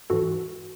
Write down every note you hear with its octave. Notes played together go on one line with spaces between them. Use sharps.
G#2 E3 F#4 A4